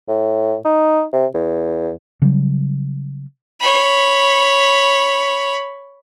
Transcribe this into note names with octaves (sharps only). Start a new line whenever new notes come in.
A2
D#4
C3
E2
C#3 F#3 G3
C#5 B5